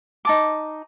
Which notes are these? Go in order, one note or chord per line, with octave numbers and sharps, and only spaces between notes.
D#4 A5 D6